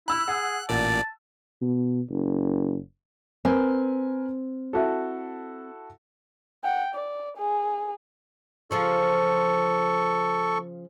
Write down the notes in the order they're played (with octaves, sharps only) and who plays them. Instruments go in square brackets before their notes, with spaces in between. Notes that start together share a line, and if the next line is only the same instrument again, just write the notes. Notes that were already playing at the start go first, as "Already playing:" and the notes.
[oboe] E4 [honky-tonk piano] B5 E6 [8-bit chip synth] F#6
[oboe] G#4 [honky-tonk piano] F#5
[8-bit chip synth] A1 A#2 D5 [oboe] A5
[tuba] B2
F#1
[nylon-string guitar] C4 [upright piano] A#4 B4 G#5
[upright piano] E4 F#4 A4
[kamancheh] F#5 G5
D5
G#4
[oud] C#3 F3 F4 [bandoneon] A4 C#6